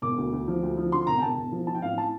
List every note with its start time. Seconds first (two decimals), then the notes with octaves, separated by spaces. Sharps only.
0.02 E1 D6
0.18 D2
0.33 D2
0.48 F3
0.63 D2
0.77 F3
0.92 D3 C6
1.07 E1 A#5
1.18 G5
1.22 E1 A5
1.37 E1
1.52 F3
1.67 F3 A5
1.74 G5
1.82 A1 F5
1.97 A2 A5